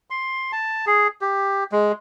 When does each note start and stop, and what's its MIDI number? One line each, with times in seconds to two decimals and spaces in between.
0.10 0.52 84
0.52 0.85 81
0.86 1.08 68
1.21 1.64 67
1.72 1.92 56